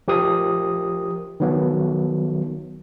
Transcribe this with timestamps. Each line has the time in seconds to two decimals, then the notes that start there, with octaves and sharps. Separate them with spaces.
0.08 F3 G4 A#4 D#6
1.40 D#3 F3 F#3 B3